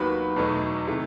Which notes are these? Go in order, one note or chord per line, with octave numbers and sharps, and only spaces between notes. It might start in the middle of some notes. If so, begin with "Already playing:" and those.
Already playing: D#2 D#3 F#3 B3 B5
E2 B2 F#3 A3 D#4
C3 D#3 A3 E4